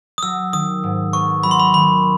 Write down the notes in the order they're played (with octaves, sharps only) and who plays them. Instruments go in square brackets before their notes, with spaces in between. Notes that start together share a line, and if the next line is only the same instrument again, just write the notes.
[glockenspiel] D#6
[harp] F#3 [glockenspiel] E6
[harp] D#3 [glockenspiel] D#6
[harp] G#2
[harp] B3 [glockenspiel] C#6
[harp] F#3 [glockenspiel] B5
[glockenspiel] C6
B5
[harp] D#3 [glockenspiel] B5